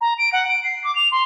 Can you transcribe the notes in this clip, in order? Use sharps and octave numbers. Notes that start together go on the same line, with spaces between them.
A#5
D7
F#5
D7
C7
D6
F7
C6